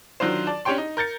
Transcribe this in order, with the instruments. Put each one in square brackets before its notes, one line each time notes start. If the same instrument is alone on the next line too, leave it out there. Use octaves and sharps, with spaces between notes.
[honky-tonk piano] D#3 F#3 D4 F4 C5
D5 A5
C#4 D4 G4 C#5 G5 C6
D#4
A#4 G6 A6 C#7